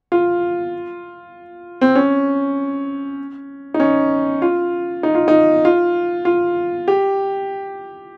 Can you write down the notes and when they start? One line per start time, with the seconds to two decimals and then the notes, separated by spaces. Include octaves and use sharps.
0.12 F4
1.81 C4
1.95 C#4
3.74 D#4
3.80 C#4
4.42 F4
5.03 D#4
5.15 F4
5.28 D#4
5.65 F4
6.25 F4
6.88 G4